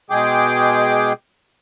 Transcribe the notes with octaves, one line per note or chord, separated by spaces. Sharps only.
B2 G#3 G#4 G5 D6